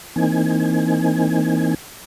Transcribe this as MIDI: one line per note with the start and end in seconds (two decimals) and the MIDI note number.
0.16 1.74 52
0.16 1.74 58
0.16 1.74 60
0.16 1.74 63
0.16 1.74 80